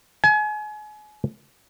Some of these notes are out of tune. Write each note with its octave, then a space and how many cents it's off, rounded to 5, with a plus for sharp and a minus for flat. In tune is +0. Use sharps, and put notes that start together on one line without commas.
G#5 +35